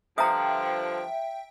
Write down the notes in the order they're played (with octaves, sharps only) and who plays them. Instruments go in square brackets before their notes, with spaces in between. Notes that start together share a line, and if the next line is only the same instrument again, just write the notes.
[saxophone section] G2 D3 F3 [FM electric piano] E5 G5 [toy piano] A#5 D#6